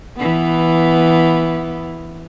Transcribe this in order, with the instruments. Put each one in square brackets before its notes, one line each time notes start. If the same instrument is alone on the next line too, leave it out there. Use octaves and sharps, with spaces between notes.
[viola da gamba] E3 B3